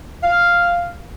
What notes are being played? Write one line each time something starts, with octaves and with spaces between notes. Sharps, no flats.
F5